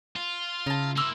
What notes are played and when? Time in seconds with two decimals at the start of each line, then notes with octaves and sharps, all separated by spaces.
0.16 F4
0.66 C#3 D#4 E4 A5
0.97 A#3 E4 C6 D6 E6